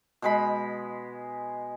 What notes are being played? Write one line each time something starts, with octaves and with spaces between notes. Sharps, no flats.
B2 G#3 B5